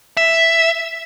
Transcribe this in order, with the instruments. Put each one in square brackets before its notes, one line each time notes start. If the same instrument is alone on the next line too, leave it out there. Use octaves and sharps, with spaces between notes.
[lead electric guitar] E5